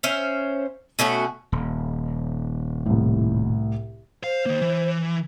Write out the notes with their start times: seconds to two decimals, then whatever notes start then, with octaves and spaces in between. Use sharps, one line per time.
0.03 C#4 C5 E5 F5
0.99 B2 A3 C#4 F#4
1.52 D#1
2.86 C2 A2
4.24 C5 F5
4.46 D#3 A#3
4.62 E3